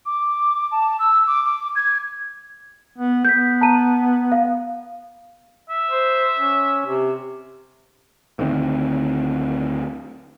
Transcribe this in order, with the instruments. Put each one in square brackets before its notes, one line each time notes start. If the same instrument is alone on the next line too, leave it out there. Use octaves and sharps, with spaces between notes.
[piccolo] D6
A5
E6
D6
D6
G#6
[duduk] B3
[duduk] B3 [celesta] G6 B6
[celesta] A5 A#5 D#7
F5
[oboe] E5
[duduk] C5
C#4
C3
[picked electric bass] D2 D3 D#3 C4